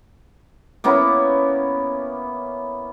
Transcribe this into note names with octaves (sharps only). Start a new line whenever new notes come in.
A#3 B3 C#4 E4